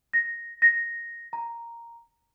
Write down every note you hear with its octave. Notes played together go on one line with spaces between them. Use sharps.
A#6
A#6
A#5